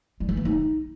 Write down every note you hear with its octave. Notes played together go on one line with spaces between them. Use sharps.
G3
E3
A#3
D#4